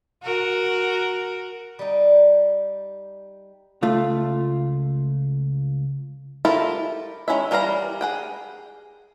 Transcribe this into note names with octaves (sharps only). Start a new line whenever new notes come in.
F#4 A#4
G3 D#4
C#2 A3 F4
E4 F4 G4 A4 A#4
D#3 G#3 C#4 E4 E5
E3 G3 A#4 F5 A#5
G#4 F#5 G5